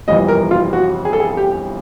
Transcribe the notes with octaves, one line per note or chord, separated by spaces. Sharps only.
G1 F2 C3 E3 D#5
A#4
F4
F#4
G#4
A4
G#4
G4